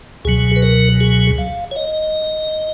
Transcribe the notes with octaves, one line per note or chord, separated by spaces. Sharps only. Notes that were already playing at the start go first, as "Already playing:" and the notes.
C#2 B2 F#3 G#4
B4
A#4
G#4
F5
C#5
D#5